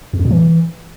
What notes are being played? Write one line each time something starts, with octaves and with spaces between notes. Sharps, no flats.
E2
F2
A#2
E3